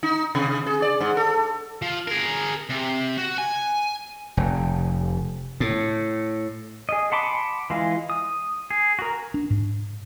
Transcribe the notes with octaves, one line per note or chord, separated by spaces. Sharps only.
D#4
C3
G#4
D5
G#2
A4
F3
G#4 A#4
C3
F#4
G#5
F1
A2
G#4 D#5
F#5 A5 B5 C6 D6
E3 G#3 F4
D#6
G#4
F#4 A#4
D4
G#2